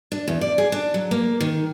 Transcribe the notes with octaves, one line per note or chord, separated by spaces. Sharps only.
D4
E2
D5
G#4
D4
F#3
A#3
D#3